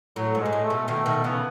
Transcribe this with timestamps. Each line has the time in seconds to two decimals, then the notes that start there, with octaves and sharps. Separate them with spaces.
0.16 A2 F#3
0.35 G#2
0.40 G#3
0.45 G#2
0.53 A2
0.64 A3
0.70 B2
0.88 B2 D#3 A3
1.06 B2 D#3 A3
1.24 C#3 E3 B3